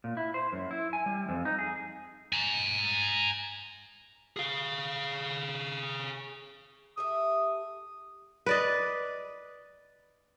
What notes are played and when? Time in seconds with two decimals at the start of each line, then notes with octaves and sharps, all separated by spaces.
0.04 A#2
0.17 E4
0.34 C5
0.53 F#2
0.71 E4
0.93 G#5
1.06 G3
1.29 F2
1.45 D#4
1.59 G#4
2.33 G#5 A#5
4.37 G#4 F5
6.98 G4 A4 E5 D#6
8.46 B4 D5 D#5